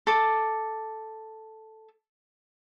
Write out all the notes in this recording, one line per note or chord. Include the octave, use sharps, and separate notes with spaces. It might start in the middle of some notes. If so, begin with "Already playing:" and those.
A4 D6